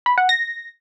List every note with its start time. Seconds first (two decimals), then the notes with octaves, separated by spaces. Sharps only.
0.06 B5
0.18 F#5
0.29 A#6